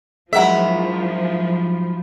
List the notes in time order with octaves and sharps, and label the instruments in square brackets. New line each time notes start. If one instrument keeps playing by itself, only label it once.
[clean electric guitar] G#2 F#3 E4 [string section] F3 [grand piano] G#3 F#5 [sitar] A#4 E5